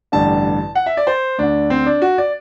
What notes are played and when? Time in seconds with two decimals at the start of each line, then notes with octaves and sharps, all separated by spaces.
0.12 A1 G2 D3 A5
0.75 F#5
0.86 E5
0.97 D5
1.07 C5
1.38 D2 D3 D4
1.70 C4
1.86 D4
2.02 F#4
2.18 D5